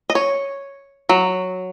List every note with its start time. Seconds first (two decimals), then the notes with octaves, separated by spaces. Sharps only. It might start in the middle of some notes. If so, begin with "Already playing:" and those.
0.10 D#5
0.15 C#5
1.09 F#3